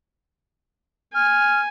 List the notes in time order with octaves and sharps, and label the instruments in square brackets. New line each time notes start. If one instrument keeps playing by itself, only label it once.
[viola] G#5 [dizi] F6